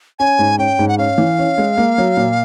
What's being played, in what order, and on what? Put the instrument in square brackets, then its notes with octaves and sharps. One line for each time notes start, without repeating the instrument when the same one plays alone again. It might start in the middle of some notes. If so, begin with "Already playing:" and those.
[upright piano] C#4 [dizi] G#5
[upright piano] G#2
[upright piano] C#4 [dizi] G5
[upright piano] G#2
[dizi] F#5
[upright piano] C#4 [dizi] F5
[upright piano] E3
C#4
G#3
A#3
F#3
A#2